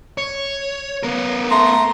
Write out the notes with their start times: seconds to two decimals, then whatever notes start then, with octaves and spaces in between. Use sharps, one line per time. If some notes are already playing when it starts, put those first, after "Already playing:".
0.18 C#5
1.03 B3 A#4
1.51 A3 A#5 C6